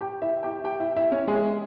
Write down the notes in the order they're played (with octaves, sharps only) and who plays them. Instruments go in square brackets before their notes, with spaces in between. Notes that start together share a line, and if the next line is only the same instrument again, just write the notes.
[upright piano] G4 G5
E4 E5
G4 G5
G4 G5
E4 E5
E4 E5
C#4 C#5
G#3 G#4